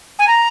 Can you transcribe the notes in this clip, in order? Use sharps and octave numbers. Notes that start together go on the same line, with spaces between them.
G#5
A#5